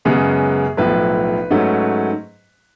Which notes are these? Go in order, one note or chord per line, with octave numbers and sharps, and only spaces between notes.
F#2 C#3 G#3 B3 G#4
B1 A2 F3 B3 B4
G#2 F#3 A3 C#4